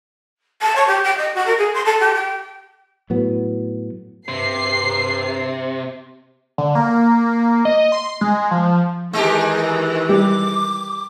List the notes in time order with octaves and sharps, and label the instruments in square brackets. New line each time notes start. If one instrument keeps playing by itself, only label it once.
[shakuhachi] A5
C#5
G4
G5
D#5
F#4
A#4
G#4
C6
A4
G4
G5
[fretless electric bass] A2 F#3 B3
[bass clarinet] G2 [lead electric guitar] C3 [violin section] C7
[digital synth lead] D3
A#3
D#5
C6
G#3
F3
[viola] D#3 E3 [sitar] G#3 G4 [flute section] D#4 G#4
[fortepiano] G3 [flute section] D6